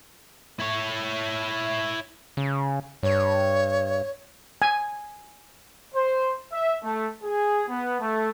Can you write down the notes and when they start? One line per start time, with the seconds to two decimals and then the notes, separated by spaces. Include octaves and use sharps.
0.60 E4 C#5
2.37 C#3
3.03 G2 C#5
4.62 G#5
5.94 C5
6.51 E5
6.83 A3
7.22 G#4
7.67 B3
7.99 A3